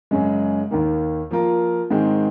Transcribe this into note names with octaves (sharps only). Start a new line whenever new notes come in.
F#2 C#3 G#3 C#4
D#2 D#3 A#3
F3 A#3 F4 A#4
G#2 D#3 G#3 C4